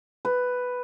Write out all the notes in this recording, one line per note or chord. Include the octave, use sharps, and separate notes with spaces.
B4